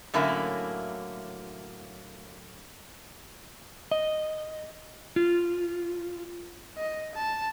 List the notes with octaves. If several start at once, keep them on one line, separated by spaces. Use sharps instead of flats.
A2 D3 F#3 A#3 C#4 E4
D#5
F4
D#5
A5